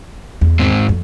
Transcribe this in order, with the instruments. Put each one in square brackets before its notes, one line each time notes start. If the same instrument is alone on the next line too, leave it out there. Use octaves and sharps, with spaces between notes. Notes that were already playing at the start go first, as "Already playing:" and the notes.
[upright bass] E2
[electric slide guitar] G#2 C4
[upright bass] F2